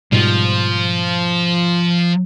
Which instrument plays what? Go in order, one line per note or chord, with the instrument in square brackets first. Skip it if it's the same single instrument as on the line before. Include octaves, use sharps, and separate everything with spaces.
[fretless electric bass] G#2 B2 G3 [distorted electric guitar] F3